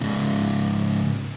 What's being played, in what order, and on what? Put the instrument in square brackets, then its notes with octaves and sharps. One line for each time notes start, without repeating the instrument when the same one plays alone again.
[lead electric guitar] G#2 C#3